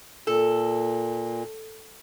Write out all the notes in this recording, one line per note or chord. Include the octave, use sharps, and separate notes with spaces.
A#2 A4